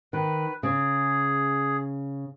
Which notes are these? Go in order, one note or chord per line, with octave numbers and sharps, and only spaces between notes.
D#3 B4
C#3 G#4